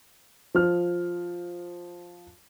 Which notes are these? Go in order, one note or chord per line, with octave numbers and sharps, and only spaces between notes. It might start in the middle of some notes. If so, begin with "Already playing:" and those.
F3 F6